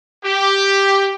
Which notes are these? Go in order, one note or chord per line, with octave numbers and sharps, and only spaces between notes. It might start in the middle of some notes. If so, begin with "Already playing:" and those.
G4